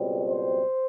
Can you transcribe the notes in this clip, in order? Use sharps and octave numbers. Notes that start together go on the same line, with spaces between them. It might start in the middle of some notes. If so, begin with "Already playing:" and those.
Already playing: C#2 B2 G3 C4
C5